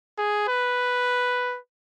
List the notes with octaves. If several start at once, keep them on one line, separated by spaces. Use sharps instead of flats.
G#4
B4